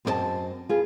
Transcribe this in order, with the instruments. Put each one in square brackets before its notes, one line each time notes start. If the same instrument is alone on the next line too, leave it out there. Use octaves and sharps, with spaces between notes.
[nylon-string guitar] F#2 C4 D#4 A#4 D#5 A5
F4 G#4 B4